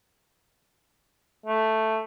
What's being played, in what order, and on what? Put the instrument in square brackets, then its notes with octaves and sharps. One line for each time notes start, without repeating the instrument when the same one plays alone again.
[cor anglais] A3